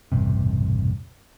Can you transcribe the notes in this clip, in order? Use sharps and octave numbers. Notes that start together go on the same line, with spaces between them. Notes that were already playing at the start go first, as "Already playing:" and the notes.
E1 A1 G2 C3